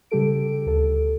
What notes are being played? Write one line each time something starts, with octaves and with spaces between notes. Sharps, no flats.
C#3 G3 G4 A4 D7
D2 A4